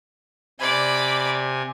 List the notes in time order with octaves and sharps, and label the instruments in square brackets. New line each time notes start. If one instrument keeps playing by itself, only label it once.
[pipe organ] C3 G#5 [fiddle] D5 B5